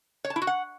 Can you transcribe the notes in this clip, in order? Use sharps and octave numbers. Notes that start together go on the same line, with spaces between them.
C#5
A5
E4
F#4
F#5